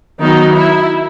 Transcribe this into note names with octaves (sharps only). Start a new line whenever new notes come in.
D#3 F#3 B3 D#4
E4